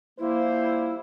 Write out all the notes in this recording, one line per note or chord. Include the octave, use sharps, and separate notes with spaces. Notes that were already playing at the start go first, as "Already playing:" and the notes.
F3 G3 A#3 E4 C5